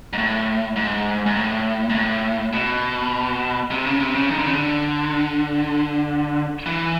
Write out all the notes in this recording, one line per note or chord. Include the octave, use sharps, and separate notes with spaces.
G#2
A2
G#2
G#2
A2
G#2
A2
B2
C3
C#3
C3
C#3
D#3
D3
C#3
D3
E3